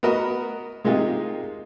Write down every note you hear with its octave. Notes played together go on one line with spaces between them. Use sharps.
B3 F#4 A#4 D#5 B5
C3 G#3 A#3 D#4 F4 G4